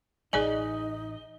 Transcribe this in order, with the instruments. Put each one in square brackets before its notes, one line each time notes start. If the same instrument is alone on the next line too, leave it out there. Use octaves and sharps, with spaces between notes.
[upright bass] A1 [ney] D#4 [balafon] G#4 D5 G#5 [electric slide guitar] D#5